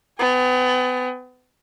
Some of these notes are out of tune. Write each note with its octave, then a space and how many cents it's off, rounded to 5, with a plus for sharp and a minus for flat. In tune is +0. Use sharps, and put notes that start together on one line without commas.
B3 +35 G#5 -40